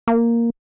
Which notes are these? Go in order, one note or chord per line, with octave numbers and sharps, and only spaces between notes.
A#3